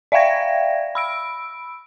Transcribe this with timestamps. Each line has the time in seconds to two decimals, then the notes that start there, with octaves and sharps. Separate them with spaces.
0.12 D5 E5 F5 G5 G#6 A#6
0.95 B5 E6 D7